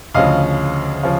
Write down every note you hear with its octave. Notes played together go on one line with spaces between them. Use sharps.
D2 C#3 F3 D#5 F5
C#3 F3